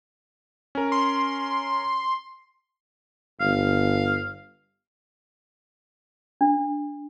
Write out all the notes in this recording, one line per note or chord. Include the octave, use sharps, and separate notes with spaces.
C#4 A#4
C6
G1 F5
D4